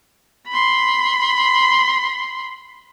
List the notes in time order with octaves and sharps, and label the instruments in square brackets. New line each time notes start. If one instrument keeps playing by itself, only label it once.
[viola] B5 C6